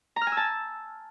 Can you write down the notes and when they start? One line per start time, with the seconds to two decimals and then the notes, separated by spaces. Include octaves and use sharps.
0.16 A#5
0.21 F6
0.27 G#5
0.32 E6
0.37 A5